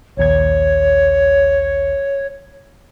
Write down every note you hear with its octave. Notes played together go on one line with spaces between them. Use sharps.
A#1 D#2 C#5 G#6